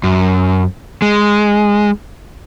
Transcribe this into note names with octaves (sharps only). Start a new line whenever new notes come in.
F#2
G#3